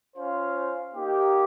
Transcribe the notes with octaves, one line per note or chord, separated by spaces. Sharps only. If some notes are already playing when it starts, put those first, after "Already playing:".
C#4 F4 C5 F5
A#3 D#4 G4